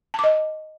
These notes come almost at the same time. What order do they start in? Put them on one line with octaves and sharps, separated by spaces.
A5 D6 D#5